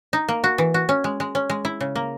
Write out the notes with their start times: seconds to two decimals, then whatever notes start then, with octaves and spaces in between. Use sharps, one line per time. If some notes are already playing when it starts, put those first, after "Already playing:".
0.13 D#4
0.28 A#3
0.44 F#4
0.58 E3
0.74 F#4
0.89 C#4
1.04 G#3
1.20 G#3
1.35 C#4
1.50 G#3
1.65 E4
1.81 C#3
1.95 A#3